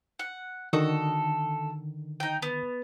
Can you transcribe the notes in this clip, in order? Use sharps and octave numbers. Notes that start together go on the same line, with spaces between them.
F#5
D3 D#3 F#4 A4 D#6
D#4 G5
B3